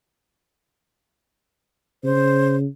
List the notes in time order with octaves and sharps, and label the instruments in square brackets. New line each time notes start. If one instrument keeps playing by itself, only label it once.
[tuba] C#3 [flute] C5